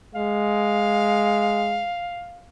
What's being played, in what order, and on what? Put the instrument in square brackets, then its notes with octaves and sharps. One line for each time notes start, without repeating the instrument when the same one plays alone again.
[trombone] G#3 [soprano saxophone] F5